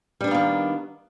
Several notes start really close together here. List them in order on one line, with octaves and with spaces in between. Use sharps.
G3 D4 B3 A#3 D#3